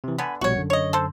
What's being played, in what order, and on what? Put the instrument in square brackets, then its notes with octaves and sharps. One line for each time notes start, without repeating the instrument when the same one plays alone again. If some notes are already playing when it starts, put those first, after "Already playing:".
[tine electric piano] C3 E3
[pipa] D3 B3 [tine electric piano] G#5 B5
[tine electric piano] A#1 B2 G3 [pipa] F#4 C#5
[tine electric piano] F#2 D3
[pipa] C#5 D#5
A4 C5